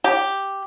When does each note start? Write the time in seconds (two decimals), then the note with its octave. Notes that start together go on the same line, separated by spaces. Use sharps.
0.04 G4